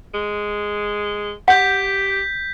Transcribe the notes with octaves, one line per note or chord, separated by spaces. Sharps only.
G#3
G4 F#5 G6 B6